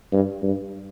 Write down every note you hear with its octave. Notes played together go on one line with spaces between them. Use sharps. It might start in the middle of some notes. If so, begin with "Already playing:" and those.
G2
G2